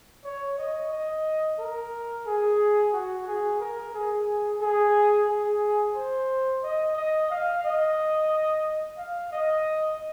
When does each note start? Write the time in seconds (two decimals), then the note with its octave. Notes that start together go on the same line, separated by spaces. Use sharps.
0.24 C#5
0.58 D#5
0.91 D#5
1.59 A#4
2.27 G#4
2.93 F#4
3.27 G#4
3.60 A#4
3.94 G#4
4.61 G#4
5.28 G#4
5.96 C5
6.63 D#5
6.97 D#5
7.30 F5
7.63 D#5
8.98 F5
9.31 D#5